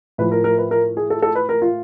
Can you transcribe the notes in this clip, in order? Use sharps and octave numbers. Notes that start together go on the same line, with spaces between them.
A2 F3 B4
A#4
A#4
B4
A#4
G#4
A4
A4
B4
A#4
F4